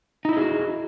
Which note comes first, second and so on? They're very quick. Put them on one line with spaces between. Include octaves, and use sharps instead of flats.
D#4 E4 D#5 G#4 F#4